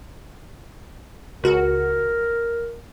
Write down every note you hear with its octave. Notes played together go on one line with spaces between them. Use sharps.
C#2 F#4 A#4